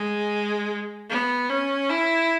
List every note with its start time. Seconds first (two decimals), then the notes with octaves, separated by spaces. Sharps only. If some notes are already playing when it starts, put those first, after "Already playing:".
Already playing: G#3
1.10 B3
1.49 C#4
1.89 E4